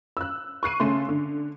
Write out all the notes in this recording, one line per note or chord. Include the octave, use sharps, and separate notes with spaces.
E6 F#6
C#6 F#6 C7 D#7
C#3 A3 C6
D3